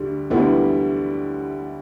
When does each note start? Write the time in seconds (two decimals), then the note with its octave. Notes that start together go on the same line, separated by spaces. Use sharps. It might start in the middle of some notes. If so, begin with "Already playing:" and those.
Already playing: D2 D3 G3
0.30 D2 D3 G3 B3 E4